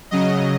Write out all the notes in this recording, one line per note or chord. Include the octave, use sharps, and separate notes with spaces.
C#3 F#3 D#5